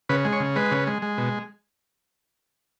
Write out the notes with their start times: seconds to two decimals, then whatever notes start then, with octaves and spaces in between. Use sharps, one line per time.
0.09 C#3 B4
0.25 G#3
0.33 C#5
0.40 C#3
0.56 G#3 B4
0.71 C#3
0.87 G#3
1.02 G#3
1.18 B2